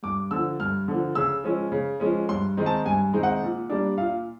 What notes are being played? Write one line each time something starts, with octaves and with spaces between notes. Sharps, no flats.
G2 D6
D3 F3 E6
G2 F6
D3 F3
C#3 E6
F3 G#3 C#4
C#3
F3 G#3 C#4
G2 C6
D#3 G#3 C4 D#4
A5
G2 G#5
D#3 G#3 C4 D#4
F#5
A#2
G3 A#3 D4
A#2 F5